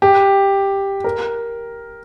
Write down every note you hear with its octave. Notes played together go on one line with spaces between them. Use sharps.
G4
A#4